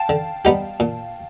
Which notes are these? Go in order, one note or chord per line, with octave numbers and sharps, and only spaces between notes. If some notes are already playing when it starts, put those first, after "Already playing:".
Already playing: F5 G5 A5
D3
G3 B3 D#4 G4
A#2